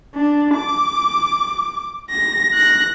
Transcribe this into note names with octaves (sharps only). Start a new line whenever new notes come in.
D4
D6
A#6
F#6 A#6